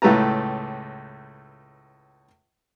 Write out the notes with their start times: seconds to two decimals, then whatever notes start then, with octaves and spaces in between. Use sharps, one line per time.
0.02 C#2 A2 A3 B4 A5 A#5